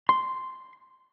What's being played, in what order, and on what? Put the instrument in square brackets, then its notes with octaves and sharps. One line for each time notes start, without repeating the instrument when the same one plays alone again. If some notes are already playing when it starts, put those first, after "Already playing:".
[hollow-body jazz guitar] C6